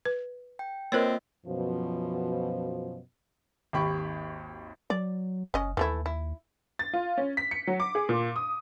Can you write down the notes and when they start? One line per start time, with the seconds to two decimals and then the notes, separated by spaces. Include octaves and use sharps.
0.05 B4
0.59 G5
0.92 A#3 C4 F4 A#4 B4 C#5 D#5
1.46 F#2 B2 F3
3.73 G#1 D#2 G4 B5 C#6
4.90 F#3 D5
5.54 F#1 C#4 D#5
5.77 D#2 E3 A3 E4
6.06 E4
6.79 A6
6.93 F4
7.18 C#4
7.37 B6
7.51 C#7
7.67 F#3
7.80 D6
7.95 G#4
8.09 A#2
8.36 D#6